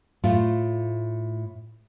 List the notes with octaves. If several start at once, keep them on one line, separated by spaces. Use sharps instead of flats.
A2 A3 F4